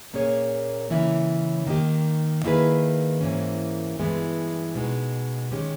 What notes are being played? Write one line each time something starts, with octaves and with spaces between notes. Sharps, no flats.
A#2 A#3 C#4 G#4 C#5
C#3 E3 A#3 C#4 E4
D#3 A#3 D#4 G4
D#3 A#3 E4 G#4 B4
G#2 E3 A#3 C#4
G2 E3 G#3 B3
B2 G#3 D#4
D#3 G#3 C#4 G4